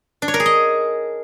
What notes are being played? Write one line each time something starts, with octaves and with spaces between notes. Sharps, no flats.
D4
C#5
A#4
G#4
D#5